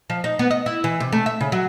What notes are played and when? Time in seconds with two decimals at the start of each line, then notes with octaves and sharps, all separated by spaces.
0.10 F3
0.24 D#4
0.39 B3
0.51 D#5
0.66 E4
0.84 E3
1.00 C3
1.12 A3
1.26 E5
1.41 C#3
1.52 F#3